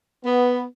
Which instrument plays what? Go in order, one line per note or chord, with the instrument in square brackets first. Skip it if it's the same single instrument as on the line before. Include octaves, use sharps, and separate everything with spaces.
[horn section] B3